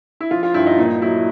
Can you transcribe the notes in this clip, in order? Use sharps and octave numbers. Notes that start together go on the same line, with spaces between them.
E4
F3 F4
F4
G2 E4
D#4
A#2 D#4
F#3 E4